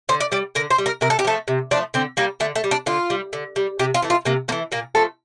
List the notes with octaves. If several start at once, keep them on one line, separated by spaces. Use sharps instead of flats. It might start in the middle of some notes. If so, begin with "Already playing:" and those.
D3 C5
D5
G3 D5
D3 A#4
C5
G3
A#4
C3 A#4
A4
G4
F3 A3 A4
C3
F3 A3 D4
D3 C4
G3 A#3
D3 A3
A3
G3
D4
D3 F4
G3
D3
G3
C3 G4
F4
E3 A3
F4
C3 A#3
E3 A3 A#3
A#2 A#3
F3 A3 A4